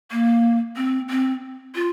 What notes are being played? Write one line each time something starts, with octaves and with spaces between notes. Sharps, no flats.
A#3
C4
C4
F4